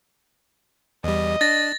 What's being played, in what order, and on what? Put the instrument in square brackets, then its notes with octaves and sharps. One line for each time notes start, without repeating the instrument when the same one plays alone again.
[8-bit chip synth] E2 G3 [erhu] D#5
[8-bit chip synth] D4 [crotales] A6 A#6